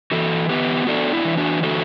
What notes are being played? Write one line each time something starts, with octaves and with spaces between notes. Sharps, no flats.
E3 F#4 A4
B3 G4 B4
D4 F#4 A4
E4
E3
D4 F#4
D3 F#4 A4